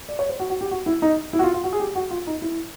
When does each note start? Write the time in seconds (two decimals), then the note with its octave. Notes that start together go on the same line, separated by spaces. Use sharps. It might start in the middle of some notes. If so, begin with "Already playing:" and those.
0.09 D5
0.19 C#5
0.29 C5
0.40 F#4
0.50 F#4
0.61 G4
0.71 F#4
0.86 E4
1.02 D#4
1.33 E4
1.39 F#4
1.43 F4
1.54 F4
1.64 F#4
1.73 G#4
1.80 G4
1.95 F#4
2.11 F4
2.27 D#4
2.42 E4